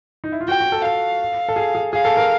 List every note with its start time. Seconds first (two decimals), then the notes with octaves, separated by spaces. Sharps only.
0.24 D#4
0.32 E4
0.41 F4
0.48 F#4 G5
0.60 F#4
0.72 A4
0.84 A4 F5
1.49 A4
1.56 G#4
1.75 G#4
1.93 G#4 F5
2.05 A4
2.17 A#4